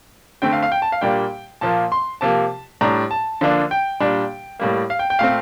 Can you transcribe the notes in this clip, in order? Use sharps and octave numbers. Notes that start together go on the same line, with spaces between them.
D3 A3 C4 G5
F5
F5
G5
A5
F5
A#2 G3 A#3 D4 G5
A#2 F3 A#3 A5
C6
C3 F3 A#3 A5
A2 G3 D4 A#5
A5
D3 F3 A#3 D4
G5
A#2 G3 D4
A2 G3 A#3
F5
G5
G5
A#2 A3 C4 F5